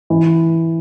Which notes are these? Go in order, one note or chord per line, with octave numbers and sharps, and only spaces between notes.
E3